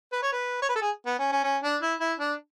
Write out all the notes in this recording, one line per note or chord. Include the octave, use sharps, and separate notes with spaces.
B4
C#5
B4
C#5
B4
A4
G#4
B3
C#4
C#4
C#4
D4
E4
E4
D4